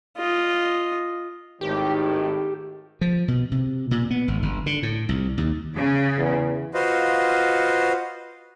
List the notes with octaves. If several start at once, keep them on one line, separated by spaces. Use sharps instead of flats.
F4 D#5
G#1 A2 D#3 G4
F3
B2
C3
A#2
B3
G#1
G1
D3
A2
C2
D#2
C#3
E2
F4 F#4 B4 C5 D#5 F5